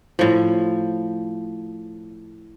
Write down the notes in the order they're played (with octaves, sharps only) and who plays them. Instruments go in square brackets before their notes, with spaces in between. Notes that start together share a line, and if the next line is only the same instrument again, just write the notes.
[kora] A2 F3